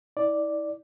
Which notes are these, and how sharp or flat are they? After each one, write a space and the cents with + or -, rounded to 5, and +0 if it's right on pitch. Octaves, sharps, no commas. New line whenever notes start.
E4 -40 D5 +0